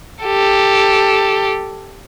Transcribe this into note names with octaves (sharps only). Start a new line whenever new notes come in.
G4 A4